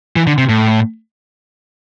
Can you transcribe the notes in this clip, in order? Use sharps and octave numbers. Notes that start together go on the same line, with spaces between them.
E3
D3
C3
A2